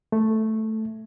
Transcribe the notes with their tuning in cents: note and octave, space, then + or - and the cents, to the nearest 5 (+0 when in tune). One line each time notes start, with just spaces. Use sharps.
A3 +0